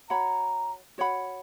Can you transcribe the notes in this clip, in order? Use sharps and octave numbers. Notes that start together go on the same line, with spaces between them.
F#4 C#5 F#5 A#5 B5
F#4 C#5 F#5 B5